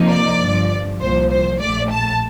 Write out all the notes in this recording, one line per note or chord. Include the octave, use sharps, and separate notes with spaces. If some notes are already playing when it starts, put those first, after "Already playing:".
Already playing: F2 C3 F3 A#3 D#4
D5
G1 G2 F3
C2 A#2 F3 C5
C5
A#1 A2 A3 D5
A5